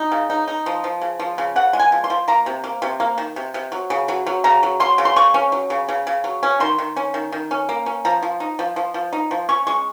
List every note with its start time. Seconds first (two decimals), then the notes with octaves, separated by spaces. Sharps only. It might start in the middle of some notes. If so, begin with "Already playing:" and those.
Already playing: D#4
0.12 C#3
0.30 D#4
0.48 D#4
0.66 F3
0.84 F3
1.01 C#3
1.19 F3
1.38 C#3
1.56 C#3 F#5
1.73 G#3
1.79 G#5
1.92 F3
2.04 C6
2.10 F3
2.28 A#3 A#5
2.46 C3
2.64 A#3
2.82 C3
3.00 A#3
3.18 D#3
3.36 C3
3.54 C3
3.72 F#3
3.90 C#3
4.08 F#3
4.26 F#3
4.44 C#3 A#5
4.63 F#3
4.80 F#3 C6
4.98 C#3
5.05 C6
5.16 C#3 C#6
5.34 C#4
5.52 F#3
5.70 C#3
5.88 C#3
6.07 C#3
6.24 F#3
6.43 C#4
6.60 D#3 C6
6.78 D#3
6.96 C#4
7.14 D#3
7.32 D#3
7.51 C#4
7.69 A#3
7.86 C#4
8.05 F3 A#5
8.22 F3
8.40 D#4
8.59 F3
8.76 F3
8.94 F3
9.13 D#4
9.31 F3
9.49 C#4 C#6
9.67 G#3 C#6